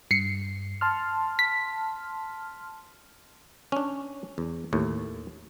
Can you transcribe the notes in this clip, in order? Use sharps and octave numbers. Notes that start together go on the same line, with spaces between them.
G2 C7 C#7
A5 C6 F6
B6
C#4 D4
E2
D#2 A2